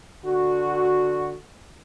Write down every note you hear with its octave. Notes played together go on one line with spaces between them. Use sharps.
D3 F#4